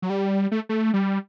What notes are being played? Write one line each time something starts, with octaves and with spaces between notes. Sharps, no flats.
F#3
G3
A3
A3
G3